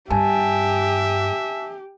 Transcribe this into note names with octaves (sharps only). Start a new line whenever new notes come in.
G2 G4 E5 G#5 A5